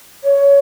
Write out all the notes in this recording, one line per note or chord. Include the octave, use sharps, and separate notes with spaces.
C#5